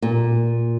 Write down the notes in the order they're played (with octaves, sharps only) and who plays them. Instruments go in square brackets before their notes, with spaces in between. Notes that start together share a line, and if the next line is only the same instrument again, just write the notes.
[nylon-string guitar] A#2